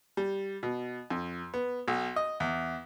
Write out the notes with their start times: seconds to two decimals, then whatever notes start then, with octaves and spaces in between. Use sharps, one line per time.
0.17 G3
0.63 B2
1.10 F2
1.54 B3
1.88 B1
2.16 D#5
2.40 E2